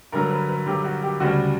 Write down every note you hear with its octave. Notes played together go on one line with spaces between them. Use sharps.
G2 D3 F#3 A#4
B4
B4
G2 D3 F#3 G4
F#4
G4
D2 C#3 G3 F#4